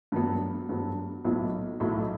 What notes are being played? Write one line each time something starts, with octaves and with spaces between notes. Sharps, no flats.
G2 F#3 B3
G2 F#3 B3
B1 A2 F#3 B3 E4
B1 A2 F#3 B3 E4